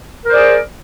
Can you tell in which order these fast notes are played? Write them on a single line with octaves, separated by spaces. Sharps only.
A#4 C5 D5 G#4